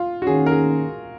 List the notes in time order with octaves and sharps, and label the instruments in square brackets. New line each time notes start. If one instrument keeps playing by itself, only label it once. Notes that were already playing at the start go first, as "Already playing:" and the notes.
Already playing: [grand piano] F4
F#4
[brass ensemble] D#3 A#3 C#4 [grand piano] G#4
[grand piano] A#4
G#4